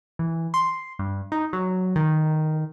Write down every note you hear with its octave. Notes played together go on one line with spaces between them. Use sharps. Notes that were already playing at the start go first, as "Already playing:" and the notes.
E3
C6
G2
D#4
F#3
D#3